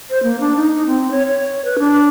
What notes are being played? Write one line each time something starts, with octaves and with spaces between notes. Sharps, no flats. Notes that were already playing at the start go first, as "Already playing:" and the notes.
C5
A#3
D4
D#4
D#4
C4
C#5
C#5
B4
D4